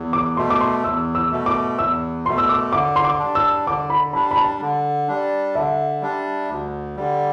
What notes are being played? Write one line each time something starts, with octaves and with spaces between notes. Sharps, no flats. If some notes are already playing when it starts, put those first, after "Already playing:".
Already playing: E2
D6
B2 A3 C6
D6
C6
E2 E6
E6
B2 A3
D6
E2 E6
B2 A3 C6
E6
D6
D3 D6
C6
D6
G3 D4
E6
D3 D6
B5
G3 D4 B5
B5
A5
D3
G3 D4
D3 E5
G3 D4
D2
D3 G3